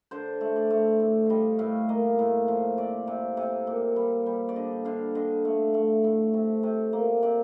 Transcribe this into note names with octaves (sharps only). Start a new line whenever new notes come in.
D3 C5
A3
D5
A3
A2
G3 D#5 F5
A2 F5
A#3 D#5
A2
F3
C3 D5
C3
C3
A#2
G3
G3
D5
D3 D#5
D3 F5
D3 D#5
A3
A3
A2
C3
C3
A#3
C3 D5